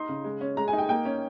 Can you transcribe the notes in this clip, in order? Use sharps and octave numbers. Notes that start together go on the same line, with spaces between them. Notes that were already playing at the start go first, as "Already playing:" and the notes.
Already playing: D#4 C6
C#3
G#3
C#4
G#3 A#5
G#5
D#4
G5
A#3 G5
C#4